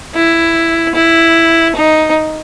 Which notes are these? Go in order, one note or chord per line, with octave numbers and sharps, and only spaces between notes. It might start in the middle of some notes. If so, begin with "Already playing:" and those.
E4
E4
D#4